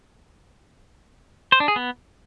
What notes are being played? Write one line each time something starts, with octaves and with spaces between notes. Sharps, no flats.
C5
D4
G#4
B3